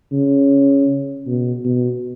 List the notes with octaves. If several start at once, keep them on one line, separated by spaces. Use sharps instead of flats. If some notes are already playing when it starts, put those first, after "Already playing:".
C#3
B2
B2